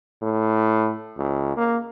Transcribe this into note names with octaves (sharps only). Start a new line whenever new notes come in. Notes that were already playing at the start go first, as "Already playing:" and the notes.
A2
C#2
A#3